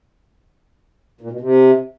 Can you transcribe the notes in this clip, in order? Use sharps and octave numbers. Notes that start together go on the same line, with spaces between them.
A#2
B2
C3